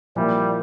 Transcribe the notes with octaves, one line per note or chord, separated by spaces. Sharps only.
A#2 F3 G3 A#3 E4 A#4